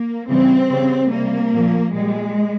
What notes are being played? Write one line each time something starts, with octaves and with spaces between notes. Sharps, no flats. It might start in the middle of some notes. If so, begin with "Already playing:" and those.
Already playing: A#3
C#3 E3 G3 C4
C#3 G3
C3 G3 A#3
A#2 F3
A#2 G3 G#3